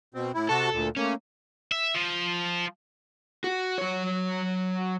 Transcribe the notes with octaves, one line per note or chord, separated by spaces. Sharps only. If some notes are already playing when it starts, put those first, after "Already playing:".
B2 C4
A2 E4
C3 F#4 A4 A5
D2 A#2
A3 A#3 C#4
E5
F3
F#4
F#3 C#5